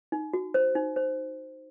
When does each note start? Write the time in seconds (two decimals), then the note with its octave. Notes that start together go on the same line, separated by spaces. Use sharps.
0.12 D#4
0.34 F#4
0.54 C5
0.75 D#4
0.96 C5